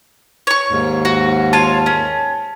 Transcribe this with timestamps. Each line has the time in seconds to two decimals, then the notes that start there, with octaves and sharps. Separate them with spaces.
0.47 C#5 C#6
0.70 D#2 G#2
1.05 F#4
1.53 F4 C#5 F5 A5
1.86 C#4